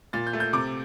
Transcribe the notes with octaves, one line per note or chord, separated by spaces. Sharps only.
A#2 A6
G6
A3
G6
C3 D6